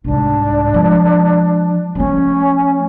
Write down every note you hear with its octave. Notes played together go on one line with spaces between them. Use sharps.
C2 G#2 D4
F3 G#3
F3 A3 C#4